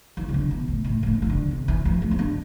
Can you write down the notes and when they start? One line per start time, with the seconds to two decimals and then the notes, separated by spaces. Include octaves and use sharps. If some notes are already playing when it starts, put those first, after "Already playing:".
0.17 E3
0.29 C3
0.34 D3
0.51 B2
0.68 A2
0.84 A2
1.03 A2
1.07 G2
1.22 E3
1.30 D3
1.51 C3
1.68 E3
1.85 F3
2.02 A3
2.11 C4
2.19 D4